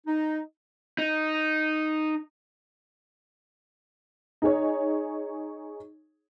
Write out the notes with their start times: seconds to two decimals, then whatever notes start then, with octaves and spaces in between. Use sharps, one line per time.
0.07 D#4
0.98 D#4
4.42 D#4 G#4 C#5